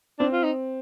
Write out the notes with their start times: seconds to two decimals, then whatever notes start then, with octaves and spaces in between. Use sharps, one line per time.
0.19 C4 D4
0.33 F4
0.44 D#4